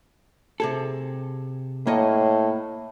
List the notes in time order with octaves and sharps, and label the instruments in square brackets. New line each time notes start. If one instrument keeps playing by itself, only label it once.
[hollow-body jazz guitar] C3 G#4 A4
[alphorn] A2 [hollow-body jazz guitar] A#3 C#5 D#5